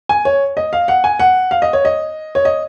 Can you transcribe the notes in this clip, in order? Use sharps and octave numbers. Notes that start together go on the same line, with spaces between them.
G#5
C#5
D#5
F5
F#5
G#5
F#5
F5
D#5
C#5
D#5
C#5
D#5